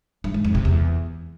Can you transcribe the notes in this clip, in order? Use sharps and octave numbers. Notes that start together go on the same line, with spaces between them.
G2
G#2
F2
C3
E2